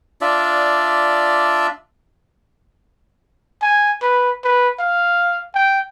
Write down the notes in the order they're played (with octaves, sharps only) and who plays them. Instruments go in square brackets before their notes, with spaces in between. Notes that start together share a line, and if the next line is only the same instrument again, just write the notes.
[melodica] D4 F4 D5 E5
[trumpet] G#5
B4
B4
F5
G5